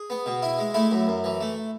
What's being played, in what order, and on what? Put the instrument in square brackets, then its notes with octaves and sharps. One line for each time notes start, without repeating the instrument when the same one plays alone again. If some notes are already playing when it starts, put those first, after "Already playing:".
Already playing: [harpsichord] G#4
B3
B2
E4
G#3
A3 E4
F#2
F#2
E3
A3